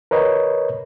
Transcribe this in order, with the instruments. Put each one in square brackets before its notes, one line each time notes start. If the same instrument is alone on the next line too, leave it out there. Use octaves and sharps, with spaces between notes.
[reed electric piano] A#4 B4 C#5 D#5